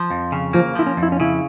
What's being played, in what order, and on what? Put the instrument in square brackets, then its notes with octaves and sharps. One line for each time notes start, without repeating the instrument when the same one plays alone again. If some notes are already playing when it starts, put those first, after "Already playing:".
Already playing: [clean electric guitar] F3
F2
C#3
[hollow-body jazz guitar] F3 [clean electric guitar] A#3
[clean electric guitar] F3 [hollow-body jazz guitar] E4
[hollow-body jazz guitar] C#4
[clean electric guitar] F2
[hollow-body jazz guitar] E4
C#4
[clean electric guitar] C#3 [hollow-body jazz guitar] E4